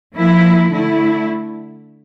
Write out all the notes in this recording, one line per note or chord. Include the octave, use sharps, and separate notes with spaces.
F3 A#3 E4
D3 A3 E4